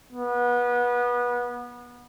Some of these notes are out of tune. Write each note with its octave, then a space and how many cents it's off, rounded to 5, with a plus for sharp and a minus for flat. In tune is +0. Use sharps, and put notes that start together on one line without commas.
B3 -25